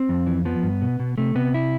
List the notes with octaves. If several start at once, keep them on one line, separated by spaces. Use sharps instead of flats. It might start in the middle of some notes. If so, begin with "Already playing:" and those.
Already playing: C4
F2
E3
F3 B3
G2
B2
B2
C3 A3
C3 B3
E4